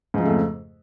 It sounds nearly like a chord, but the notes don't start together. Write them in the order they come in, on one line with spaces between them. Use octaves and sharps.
G#2 F3 C#3 A3 F2